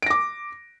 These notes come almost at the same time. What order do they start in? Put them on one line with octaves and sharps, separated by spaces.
D7 A#6 D6